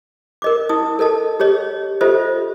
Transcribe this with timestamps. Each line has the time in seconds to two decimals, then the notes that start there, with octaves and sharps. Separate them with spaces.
0.42 A#4 D#5 D6
0.69 E4 D#6
0.99 A4 A#4 D#5 A5
1.40 G4 G#4 C#5 D#5
2.01 F4 G4 A4 C5 D#5 E5